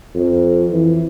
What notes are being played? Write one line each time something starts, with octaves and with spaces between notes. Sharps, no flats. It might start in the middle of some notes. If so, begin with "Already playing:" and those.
F2
E3